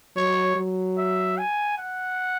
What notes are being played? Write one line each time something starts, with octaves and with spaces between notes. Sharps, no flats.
F#3 C#5
F#3
E5
G#5
F#5